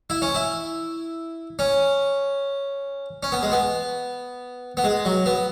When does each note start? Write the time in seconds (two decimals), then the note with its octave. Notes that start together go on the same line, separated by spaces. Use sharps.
0.10 E4
0.22 C#4
0.35 E4
1.59 C#4
3.23 C#4
3.32 B3
3.43 G#3
3.52 B3
4.77 B3
4.84 G#3
5.05 F#3
5.26 B3